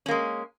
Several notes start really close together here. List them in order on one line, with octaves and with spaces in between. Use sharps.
C#4 A#3 G#3